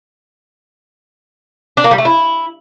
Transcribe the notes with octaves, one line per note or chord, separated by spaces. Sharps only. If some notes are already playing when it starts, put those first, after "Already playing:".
D4
A#3
G3
A3
E4